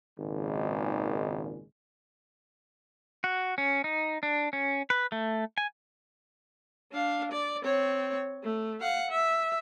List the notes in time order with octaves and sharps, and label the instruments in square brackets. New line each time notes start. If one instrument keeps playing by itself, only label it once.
[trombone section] G#1 C#2 A#2 D#3 G#3
[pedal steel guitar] F#4
C#4
D#4
D4
C#4
B4
A3
G#5
[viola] D4 F5
D5
C4 C#5
A3
F5 F#5
E5